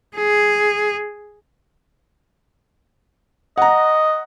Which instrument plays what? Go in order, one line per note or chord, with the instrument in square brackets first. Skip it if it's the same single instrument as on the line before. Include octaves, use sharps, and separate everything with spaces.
[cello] G#4
[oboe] D#5 [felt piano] F#5 A#5